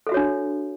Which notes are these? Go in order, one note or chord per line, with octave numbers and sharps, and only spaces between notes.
D4 F#4 A4 C#5 E5